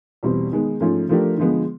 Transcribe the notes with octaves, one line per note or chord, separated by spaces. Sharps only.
E2 B2 G3 C4
D#3 G#3 B3
G#2 F3 A3 C#4 F4
F3 A3 D4 G4 A#4
D3 F3 G#3 B3